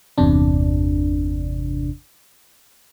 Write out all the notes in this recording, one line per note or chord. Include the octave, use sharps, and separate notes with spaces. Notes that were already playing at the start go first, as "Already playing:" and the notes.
G1 E2 C3 D4